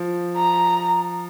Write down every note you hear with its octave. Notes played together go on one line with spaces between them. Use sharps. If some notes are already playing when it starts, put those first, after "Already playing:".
Already playing: F3
A#5